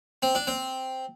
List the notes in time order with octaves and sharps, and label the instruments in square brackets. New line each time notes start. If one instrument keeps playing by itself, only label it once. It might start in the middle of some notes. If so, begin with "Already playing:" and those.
[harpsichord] C4
D4
C4